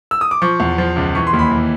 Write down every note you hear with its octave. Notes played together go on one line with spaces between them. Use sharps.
E6
D#6
D6
F3 C#6
E2
F3
C#2
E3 C#6
C6
D#2
B5
E3